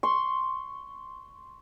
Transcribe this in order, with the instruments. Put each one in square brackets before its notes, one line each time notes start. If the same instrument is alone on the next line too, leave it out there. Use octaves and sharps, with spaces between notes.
[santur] C6 [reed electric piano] C#6